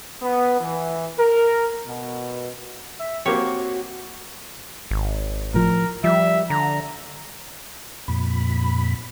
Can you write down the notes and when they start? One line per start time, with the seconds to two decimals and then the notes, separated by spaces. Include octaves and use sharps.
0.21 B3
0.60 E3
1.19 A#4
1.87 B2
2.99 E5
3.26 A#3 C4 F#4 G4 C#5
4.91 G#1
5.54 A2 F3 A#4
6.04 F3 G3 E5
6.50 D3 A#5
8.08 F2 A#2 B5